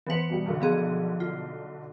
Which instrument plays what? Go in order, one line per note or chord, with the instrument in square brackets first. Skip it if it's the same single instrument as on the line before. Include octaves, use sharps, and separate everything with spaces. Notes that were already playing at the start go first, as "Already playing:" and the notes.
[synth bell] E3 B4 [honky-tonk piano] B3 C5 C#7
[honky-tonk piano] B2 F#3 G3
B1 D3
[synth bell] F3 B3 G#4
F4